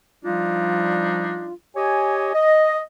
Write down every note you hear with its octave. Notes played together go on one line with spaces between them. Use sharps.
F3 G3 D4 D#4 F4
G4 C#5 D#5 G#5
D#5